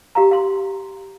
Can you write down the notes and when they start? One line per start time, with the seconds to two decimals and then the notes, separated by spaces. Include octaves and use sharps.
0.15 G4 F5 A#5
0.31 F5 C6